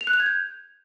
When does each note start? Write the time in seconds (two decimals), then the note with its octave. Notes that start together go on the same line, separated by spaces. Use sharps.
0.01 F7
0.07 F#6
0.13 F7
0.20 G#6
0.26 G6